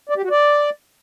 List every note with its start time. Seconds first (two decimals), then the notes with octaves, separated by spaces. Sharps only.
0.09 D5
0.16 G4
0.24 F#4
0.31 D5